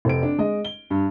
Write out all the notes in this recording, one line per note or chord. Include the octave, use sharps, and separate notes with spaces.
F1 C4 D7
D4
G#3 D#5
G7
G2